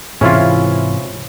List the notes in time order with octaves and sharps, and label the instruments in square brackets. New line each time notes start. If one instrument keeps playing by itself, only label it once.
[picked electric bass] G#2 C3 E3 [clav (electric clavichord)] C#4 E4 F4